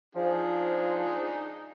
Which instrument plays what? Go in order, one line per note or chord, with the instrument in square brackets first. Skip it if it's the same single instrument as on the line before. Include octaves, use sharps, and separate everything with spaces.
[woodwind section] F3 [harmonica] D4 D#4 G#4